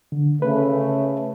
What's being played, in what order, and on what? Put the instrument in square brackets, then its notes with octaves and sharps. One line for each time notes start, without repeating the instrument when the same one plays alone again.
[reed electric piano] D3
[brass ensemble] C#3 A3 [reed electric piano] B4